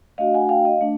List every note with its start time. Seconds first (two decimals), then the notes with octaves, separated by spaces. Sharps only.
0.18 A3 D4 F#4 D#5 F5
0.34 F#5 G#5
0.49 F5 G5
0.65 D#5 F5
0.81 A3 D4